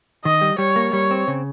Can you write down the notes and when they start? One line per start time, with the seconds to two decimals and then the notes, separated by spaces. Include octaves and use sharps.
0.25 D#3 D#5
0.41 G3
0.58 G3 C#5
0.76 A#3
0.93 G3 C#5
1.11 C4
1.28 C#3